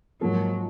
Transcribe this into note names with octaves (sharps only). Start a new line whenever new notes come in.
G#2 F3 F#3 A#3